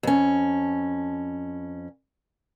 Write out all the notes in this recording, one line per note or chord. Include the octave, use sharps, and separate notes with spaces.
F2 C#4